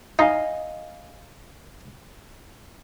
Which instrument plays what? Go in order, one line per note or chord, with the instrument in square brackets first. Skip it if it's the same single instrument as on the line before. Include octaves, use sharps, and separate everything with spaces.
[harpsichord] D#4 [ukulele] D#5 F5 G#5